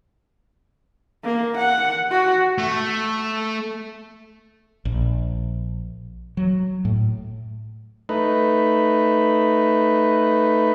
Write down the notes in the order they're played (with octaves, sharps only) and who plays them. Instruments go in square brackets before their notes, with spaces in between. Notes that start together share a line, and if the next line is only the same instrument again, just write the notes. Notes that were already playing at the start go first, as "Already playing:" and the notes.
[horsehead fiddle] A#3
F#5
F#4
[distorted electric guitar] A3
[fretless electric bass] A#1
F#3
A2
[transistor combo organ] A3 D#4 B4